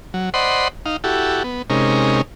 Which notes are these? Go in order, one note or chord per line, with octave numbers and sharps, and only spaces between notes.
F#3
C5 D5 D#5 F#5 B5 C6
D#4 F5
E4 F#4 G4 A4
B3
C3 G#3 C#4 D#4 A#4